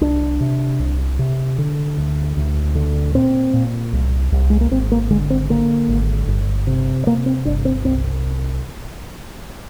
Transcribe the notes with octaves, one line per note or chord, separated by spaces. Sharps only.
C2 D4
C3
C2
C3
D3
D2
D2
D3
A#2 C4
A#2
C2
C2
G#3
A#3
G#1 C4
A#3
D3 G#3
C4
D3 A#3
G#1
G1
C3
C3 A#3
C4
G1 D4
C4
C2 C4